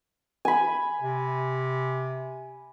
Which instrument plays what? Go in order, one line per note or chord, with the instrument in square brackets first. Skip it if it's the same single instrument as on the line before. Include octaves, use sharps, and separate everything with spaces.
[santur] G#5 B5
[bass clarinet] C3